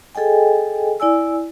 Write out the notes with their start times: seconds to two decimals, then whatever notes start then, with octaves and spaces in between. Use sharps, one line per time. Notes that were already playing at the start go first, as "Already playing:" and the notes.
0.15 G#4 A4 D#5 G5 G#5
1.00 E4 D5 G#5 E6